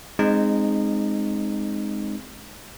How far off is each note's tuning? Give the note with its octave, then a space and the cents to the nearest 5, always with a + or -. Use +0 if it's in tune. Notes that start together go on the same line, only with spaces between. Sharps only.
G#3 +0 C4 +0 D#4 -20